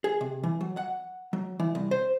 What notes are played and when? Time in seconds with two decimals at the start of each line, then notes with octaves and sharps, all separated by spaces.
0.04 G#4
0.21 C3
0.43 E3
0.61 F#3
0.77 F#5
1.33 F#3
1.60 E3
1.75 C2
1.91 C5